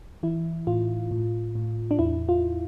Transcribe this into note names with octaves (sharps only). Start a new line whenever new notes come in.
E3 E4
A2 F4
A2
A2
D4
E2 E4
F4